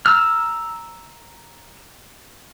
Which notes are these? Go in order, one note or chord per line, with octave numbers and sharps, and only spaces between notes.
A#5 E6 F6